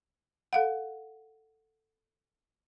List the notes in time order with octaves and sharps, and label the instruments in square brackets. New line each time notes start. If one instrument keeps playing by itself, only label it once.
[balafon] A4 F5 F#5